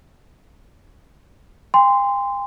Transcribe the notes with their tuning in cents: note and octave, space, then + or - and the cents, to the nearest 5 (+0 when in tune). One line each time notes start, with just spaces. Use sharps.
G5 +45 C6 -15